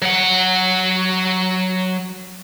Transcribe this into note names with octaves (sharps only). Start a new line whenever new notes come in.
F#3 F#5